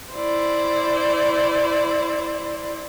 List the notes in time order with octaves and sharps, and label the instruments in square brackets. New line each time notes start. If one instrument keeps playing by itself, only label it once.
[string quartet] E4 C5 D5